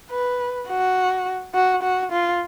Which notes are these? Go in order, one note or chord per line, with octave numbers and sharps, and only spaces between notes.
B4
F#4
F#4
F#4
F4